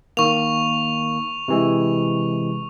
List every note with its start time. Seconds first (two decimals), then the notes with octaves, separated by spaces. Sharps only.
0.17 D#3 A#3 C#6 F7
1.48 C3 E3 G#3